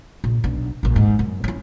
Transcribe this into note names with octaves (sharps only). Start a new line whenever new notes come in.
A#1
B1 D4
A#1 A#2
G#2
F#2
C#4 E4